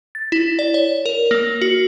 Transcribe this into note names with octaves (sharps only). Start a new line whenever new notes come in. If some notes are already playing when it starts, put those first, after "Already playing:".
A6
E4
D5
C#5
A#4
A#3
F#4